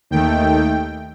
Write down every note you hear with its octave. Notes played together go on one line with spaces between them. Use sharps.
D#2 D#3 A3 G5